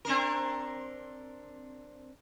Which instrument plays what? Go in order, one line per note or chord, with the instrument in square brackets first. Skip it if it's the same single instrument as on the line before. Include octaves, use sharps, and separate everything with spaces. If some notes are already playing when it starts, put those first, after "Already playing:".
[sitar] C4 D4 A#4